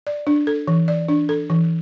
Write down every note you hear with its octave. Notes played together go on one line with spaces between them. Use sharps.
D5
D4
A4
E3
D5
D4
A4
E3